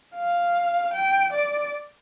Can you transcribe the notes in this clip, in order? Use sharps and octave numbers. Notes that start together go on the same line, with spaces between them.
F5
G5
D5